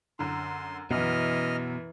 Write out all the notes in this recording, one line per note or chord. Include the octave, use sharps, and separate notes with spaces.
F#2 D3 C6
F#2 B2 E3 D#5 F6